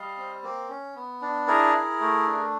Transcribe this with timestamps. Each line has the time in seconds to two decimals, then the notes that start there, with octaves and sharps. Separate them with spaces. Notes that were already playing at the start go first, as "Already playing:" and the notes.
Already playing: G3 D#5 F5
0.17 C4
0.43 A#3
0.69 C#4
0.95 B3
1.22 D4
1.48 E4 G#4 A#4
1.74 E4
2.01 A3
2.27 D4